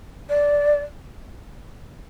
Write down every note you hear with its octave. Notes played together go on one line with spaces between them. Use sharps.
D5